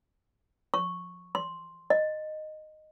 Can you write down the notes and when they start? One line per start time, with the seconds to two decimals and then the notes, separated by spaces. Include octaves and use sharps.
0.74 C#6
1.35 C6
1.90 D#5